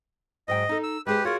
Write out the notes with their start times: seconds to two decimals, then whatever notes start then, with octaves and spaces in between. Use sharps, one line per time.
0.48 G#2 F#3 D#5 G5
0.69 D#4 A4
0.83 E6
1.07 G#3 G4 G#4 B4 C5
1.25 F4 F#4 G#4 A#4 C#5